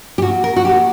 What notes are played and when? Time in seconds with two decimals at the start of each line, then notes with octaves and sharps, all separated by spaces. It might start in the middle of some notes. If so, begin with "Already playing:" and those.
0.18 G4
0.22 A#2 F#4
0.44 A#4
0.56 F#4
0.65 G4